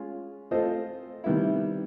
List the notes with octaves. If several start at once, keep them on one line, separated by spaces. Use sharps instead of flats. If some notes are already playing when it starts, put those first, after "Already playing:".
Already playing: G#3 C#4 F4
C4 F4 A4 C5 D#5
C3 D#3 G3 B3 E4